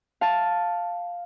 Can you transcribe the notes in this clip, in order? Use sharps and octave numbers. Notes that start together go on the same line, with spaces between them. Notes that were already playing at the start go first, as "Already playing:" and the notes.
F5 A5